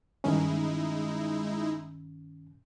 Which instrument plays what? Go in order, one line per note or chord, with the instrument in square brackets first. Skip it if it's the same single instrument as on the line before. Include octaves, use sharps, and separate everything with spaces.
[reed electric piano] G2 D#3 C#4 [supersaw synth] G#3 D#4 E4